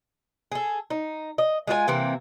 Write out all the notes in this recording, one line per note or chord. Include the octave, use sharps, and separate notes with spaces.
G#4 A4
D#4
D#5
G#3 F4 F#4 G#5
C3 E3 A#3 C4